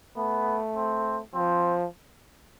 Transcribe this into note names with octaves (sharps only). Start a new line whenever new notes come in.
A3 B3
C4
F3 C4